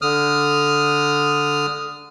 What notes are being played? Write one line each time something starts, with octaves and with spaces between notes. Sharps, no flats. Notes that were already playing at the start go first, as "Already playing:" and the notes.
D3 D#6 F6